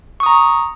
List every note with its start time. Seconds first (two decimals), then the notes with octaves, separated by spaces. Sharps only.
0.20 C#6
0.23 D#6
0.26 A#5